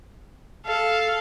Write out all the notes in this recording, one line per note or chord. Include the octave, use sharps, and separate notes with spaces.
A4 F5